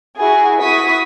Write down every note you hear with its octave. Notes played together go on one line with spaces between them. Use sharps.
E4 F#4 G#4
E4 F#4 C#6 D#6 B6